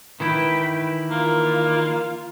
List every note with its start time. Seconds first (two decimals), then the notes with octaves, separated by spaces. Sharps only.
0.20 D#3 E3 E4 B4 G5
1.11 A#3 F4